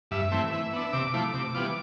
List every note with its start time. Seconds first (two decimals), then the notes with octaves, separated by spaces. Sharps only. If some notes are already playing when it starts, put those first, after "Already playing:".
0.11 G2 E5
0.32 E3 A3 C4
0.52 E3
0.73 B3 D4
0.93 C3 D6
1.14 F3 A3 E4
1.33 C3
1.54 E3 G3 B3 F4